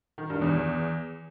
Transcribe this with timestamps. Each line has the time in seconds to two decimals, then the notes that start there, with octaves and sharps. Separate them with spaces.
0.18 D#3
0.30 G2
0.42 E2